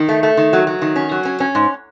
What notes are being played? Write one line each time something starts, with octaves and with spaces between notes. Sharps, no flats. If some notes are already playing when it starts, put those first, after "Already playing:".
Already playing: D#3
A3
A3
D#3
F#3
F#3
D#3
C#4
F#3
C#4
C#4
G#2